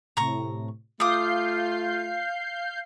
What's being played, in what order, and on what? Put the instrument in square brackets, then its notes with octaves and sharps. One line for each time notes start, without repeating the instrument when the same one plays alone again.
[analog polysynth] A2 C3 [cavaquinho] A#5 C#6
[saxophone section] A3 F4 [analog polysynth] F5 G6 C7 [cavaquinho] D6 D#6